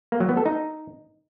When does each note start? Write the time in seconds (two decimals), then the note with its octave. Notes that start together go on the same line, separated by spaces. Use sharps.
0.12 A#3
0.20 F#3
0.29 B3
0.37 A4
0.46 D#4